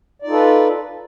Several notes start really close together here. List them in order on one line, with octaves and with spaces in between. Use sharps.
D5 D#4 F4 A4 B4